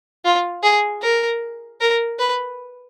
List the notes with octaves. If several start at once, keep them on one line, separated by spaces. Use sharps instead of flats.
F4
G#4
A#4
A#4
B4